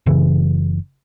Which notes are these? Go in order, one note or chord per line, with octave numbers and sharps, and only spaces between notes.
F#1 C#3 E3